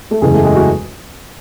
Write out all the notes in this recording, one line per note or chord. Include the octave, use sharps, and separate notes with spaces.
A3 A4
F#1 E2 C#3 E3 G#3 G#4
A3 A4
G#3 G#4
F#4